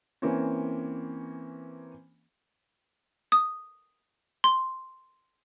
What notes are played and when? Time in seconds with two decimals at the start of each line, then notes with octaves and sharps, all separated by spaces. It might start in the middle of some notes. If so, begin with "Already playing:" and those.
0.22 E3 A#3 C4 C#4
3.32 D#6
4.44 C6